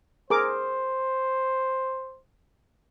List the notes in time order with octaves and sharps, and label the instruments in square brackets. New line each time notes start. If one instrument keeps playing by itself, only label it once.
[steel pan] G#4 A#4 D6 [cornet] C5